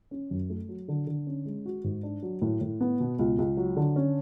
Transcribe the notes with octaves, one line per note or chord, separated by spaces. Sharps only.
C#4
F#2
A3
F#3
D3
D3
C#4
G#3
F#4
G#2
D4
F#3
A2
A2
B3
B2
C#2
C#2
F#3
D3
C#4